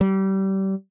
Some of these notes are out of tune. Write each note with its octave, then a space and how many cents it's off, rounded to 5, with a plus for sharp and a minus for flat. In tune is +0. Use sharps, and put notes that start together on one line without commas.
G3 -25